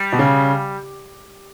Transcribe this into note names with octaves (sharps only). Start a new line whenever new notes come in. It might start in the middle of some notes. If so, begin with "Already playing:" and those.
Already playing: G3
B2
C#3